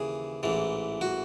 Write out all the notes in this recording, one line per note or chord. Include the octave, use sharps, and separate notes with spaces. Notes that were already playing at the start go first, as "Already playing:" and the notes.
Already playing: D#2 C#3 E3 G#4
A1 G#2 E3
F#4